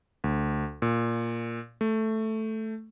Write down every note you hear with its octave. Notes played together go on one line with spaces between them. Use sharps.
D2
A#2
A3